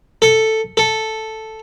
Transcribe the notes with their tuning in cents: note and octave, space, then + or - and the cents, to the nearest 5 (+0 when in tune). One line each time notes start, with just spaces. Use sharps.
A4 +5
A4 +0